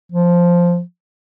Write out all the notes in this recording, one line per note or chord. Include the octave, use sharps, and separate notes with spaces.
F3